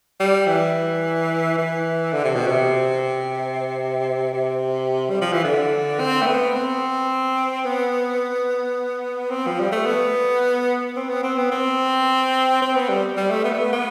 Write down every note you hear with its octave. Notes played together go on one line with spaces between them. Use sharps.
G3
E3
E3
D3
C3
B2
C3
C3
G3
F3
E3
D3
C4
A3
B3
C4
B3
C4
F3
G3
A3
B3
C4
B3
C4
B3
C4
C4
B3
G3
G3
A3
B3
A3
B3
B3